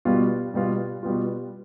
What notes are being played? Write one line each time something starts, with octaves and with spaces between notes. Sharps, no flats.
B2 G3 B3 F4
B2 G3 B3 F4
B2 G3 B3 F4